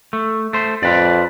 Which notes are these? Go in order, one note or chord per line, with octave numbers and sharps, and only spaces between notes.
A3
A3 C5
F2 F4 B4 D5